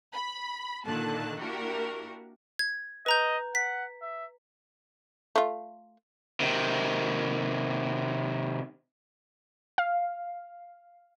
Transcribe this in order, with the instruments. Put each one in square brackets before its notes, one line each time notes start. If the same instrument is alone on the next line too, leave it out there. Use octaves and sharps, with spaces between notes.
[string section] B5
A#2 D3 D#3 A#3 A5 F#6
A#3 D4 E4 F#4 G4 A#4
[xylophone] G#6
[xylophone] B4 A#5 G6 [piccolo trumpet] D#5
[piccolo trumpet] F#5 [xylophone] B6
[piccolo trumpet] E5
[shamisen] A3 F4
[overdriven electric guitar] C3 D#3
[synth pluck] F5